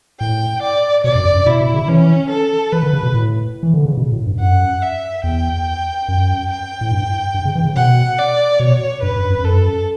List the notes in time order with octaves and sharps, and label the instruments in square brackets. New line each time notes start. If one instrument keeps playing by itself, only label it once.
[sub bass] A2 [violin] G5
[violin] D5
[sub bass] B2 [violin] D5
[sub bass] F#2
F#2
G2
[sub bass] B2 [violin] E4
[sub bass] B2
C#3
[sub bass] E3 [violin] C#4
[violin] A4
[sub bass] E3 [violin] B4
[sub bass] D3
C#3
B2
A2
E3
D3
C#3
B2
A2
G2
[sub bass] F#2 [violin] F#5
[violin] E5
[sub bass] E2 [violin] G5
[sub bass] F#2
[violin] G5
[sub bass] A2
G2
G2
C#3
E3
C#3
[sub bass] B2 [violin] F#5
[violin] D5
[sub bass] B2 [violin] C#5
[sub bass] G2 [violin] B4
[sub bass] G2
F#2
[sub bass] F#2 [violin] A4